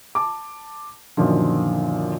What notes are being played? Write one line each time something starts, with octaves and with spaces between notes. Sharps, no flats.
A5 D6
F#2 A#2 D3 D#3 F3